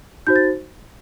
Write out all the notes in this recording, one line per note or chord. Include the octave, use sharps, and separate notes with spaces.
D#4 F#4 C5 G6
A6